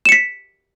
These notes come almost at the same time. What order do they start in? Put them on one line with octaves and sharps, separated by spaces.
E7 C#7 B6